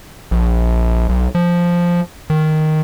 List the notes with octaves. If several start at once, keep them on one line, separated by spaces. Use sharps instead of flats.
A#1
B1
F3
D#3